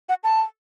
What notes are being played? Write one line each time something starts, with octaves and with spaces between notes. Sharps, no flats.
F#5
A5